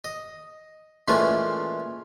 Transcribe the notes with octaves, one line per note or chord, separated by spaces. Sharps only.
D#5
A#2 E3 G#3 A3 C#4 F4